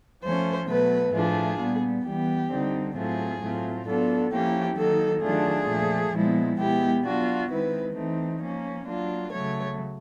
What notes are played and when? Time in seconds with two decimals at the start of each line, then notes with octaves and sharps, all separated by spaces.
0.22 F3 A3 C#4 C5
0.67 B2 F#3 A3 B4
1.13 A2 F3 A3 D4 F4 G#4
1.59 A#2 G3 B3
2.04 E3 G3 B3 G4
2.50 D3 G3 C4 D#4
2.95 A2 F#3 A3 C4 F4 G#4
3.40 A2 F#3 A3 C4 F4
3.86 F#3 B3 D4 F4 A4
4.31 F3 A#3 C#4 E4 G4
4.77 D#3 F#3 A#3 D#4 A4
5.22 D#3 F#3 A3 D4 F4 G#4
5.67 A#2 F3 A3
6.13 A#2 F3 G#3 B3 E4
6.58 B2 G#3 B3 E4 G4
7.05 F#3 B3 D4 F4 F#4
7.49 D#3 G#3 C4 E4 B4
7.95 E3 A3 C4 D#4
8.41 F3 A#3 C#4
8.86 F#3 A#3 D4 F4
9.31 C#3 F#3 A3 C#5